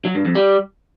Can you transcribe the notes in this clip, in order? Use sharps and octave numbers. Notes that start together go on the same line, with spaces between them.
F#3
G2
F2
G3